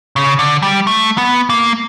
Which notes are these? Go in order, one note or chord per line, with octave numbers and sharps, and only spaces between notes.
C#3
D3
G3
A3
B3
A#3